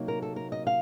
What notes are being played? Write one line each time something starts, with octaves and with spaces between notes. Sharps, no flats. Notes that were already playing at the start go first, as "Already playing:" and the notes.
Already playing: C3 F#3 A#3 D#4
A#4
A4
A#4
D#5
F5